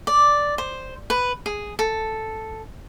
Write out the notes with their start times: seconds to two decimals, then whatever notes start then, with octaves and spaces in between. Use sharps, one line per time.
0.07 D5
0.58 C5
1.10 B4
1.46 G#4
1.79 A4